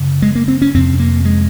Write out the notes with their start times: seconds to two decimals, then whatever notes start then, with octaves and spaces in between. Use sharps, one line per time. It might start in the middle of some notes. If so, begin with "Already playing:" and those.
Already playing: F#2 C#3
0.22 G#3
0.35 A#3
0.48 C4
0.62 C#4
0.74 F2 C3 C4
0.99 A#3
1.25 G#3